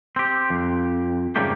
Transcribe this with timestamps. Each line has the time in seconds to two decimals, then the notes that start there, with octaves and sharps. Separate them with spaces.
0.16 C4 G4
0.50 F2
1.36 G#2 C#3 G3 A3 A#3 G4